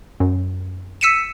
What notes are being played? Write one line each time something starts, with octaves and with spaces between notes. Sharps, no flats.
F#2
E6 B6 C#7 D#7 E7